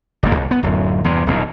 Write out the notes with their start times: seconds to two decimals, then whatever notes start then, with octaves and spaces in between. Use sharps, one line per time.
0.23 F#1 G2 A#3
0.35 C2
0.51 B3
0.63 D1 F#2
1.04 E2 G2 C3
1.26 D#1 B1 E2